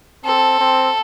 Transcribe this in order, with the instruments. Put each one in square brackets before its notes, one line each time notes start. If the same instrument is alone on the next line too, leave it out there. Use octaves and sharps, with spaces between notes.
[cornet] C4 [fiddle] A4
[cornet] C4